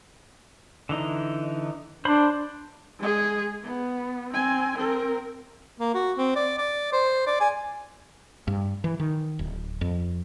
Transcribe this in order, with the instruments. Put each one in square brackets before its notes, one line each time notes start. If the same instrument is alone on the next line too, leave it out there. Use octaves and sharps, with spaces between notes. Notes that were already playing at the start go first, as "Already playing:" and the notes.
[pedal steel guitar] D3 E3 D#4
[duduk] D4 [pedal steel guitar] C5 B5
[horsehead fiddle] G#3 G#4
B3
C4 G#5
C4 A#4
[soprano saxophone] A#3
F#4
C4
D5
D5
C5
D5
G#5
[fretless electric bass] G2
E3
D#3
D1
F2